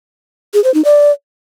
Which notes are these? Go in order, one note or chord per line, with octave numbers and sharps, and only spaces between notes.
G#4
C5
D#4
D5